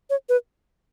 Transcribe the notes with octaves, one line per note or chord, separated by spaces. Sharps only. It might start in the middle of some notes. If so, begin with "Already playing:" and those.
C#5
B4